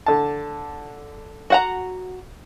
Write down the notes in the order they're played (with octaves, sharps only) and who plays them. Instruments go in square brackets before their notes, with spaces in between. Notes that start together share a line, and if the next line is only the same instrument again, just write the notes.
[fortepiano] D3 A5
[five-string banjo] F#4 F#5 A#5